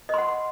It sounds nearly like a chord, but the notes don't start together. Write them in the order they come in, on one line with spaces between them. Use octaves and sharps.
D#5 C6 F#5